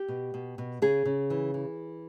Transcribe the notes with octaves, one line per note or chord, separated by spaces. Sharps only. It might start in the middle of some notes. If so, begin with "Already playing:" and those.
Already playing: G4
B2
B2
B2
C#3 G#4
C#3
E3
E3